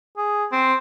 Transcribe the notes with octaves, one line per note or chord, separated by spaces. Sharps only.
G#4
C4